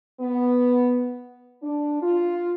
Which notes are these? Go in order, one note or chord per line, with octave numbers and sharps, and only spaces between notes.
B3
D4
F4